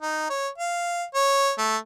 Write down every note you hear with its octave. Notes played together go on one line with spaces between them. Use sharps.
D#4
C#5
F5
C#5
A3